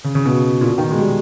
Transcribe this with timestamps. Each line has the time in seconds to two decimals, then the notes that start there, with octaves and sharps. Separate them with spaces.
0.04 C#3
0.15 C#3
0.25 B2
0.61 A#2
0.68 B2
0.78 D#3
0.91 G#3
0.99 G3